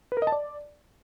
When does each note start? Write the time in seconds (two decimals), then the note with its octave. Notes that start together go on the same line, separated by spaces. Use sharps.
0.12 B4
0.17 A#4
0.22 D#5
0.27 A5
0.32 D5